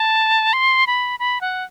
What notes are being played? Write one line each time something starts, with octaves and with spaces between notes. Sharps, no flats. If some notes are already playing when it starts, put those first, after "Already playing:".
Already playing: A5
C6
B5
B5
F#5